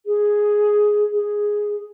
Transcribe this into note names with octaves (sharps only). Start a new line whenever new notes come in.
G#4
G#4